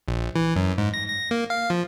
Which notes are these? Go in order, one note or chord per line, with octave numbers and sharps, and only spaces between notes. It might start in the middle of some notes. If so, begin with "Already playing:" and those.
A#1
E3
F#2
G#2
A#6
A#6
A#3
F5
F3